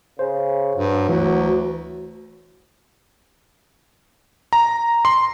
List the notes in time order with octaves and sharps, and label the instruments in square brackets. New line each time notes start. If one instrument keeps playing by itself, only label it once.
[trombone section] C#3 [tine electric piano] C5
[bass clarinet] G2 [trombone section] F#3
[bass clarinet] D2 [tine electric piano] E3 F#4
[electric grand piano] A#5
C6